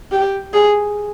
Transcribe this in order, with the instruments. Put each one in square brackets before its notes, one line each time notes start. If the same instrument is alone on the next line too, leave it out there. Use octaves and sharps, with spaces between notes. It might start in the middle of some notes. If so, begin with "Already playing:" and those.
[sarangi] G4
G#4